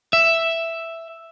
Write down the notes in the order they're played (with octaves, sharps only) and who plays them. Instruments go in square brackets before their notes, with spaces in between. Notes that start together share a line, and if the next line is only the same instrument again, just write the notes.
[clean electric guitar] E5